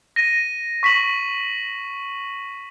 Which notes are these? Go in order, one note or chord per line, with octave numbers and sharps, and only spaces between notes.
A#6 D#7
C#6 B6 E7 F#7